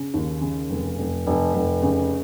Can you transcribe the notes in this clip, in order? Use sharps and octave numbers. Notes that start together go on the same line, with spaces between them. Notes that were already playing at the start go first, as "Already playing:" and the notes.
Already playing: C#3
D#2
C#3
F1
F1
F1
F1
C#3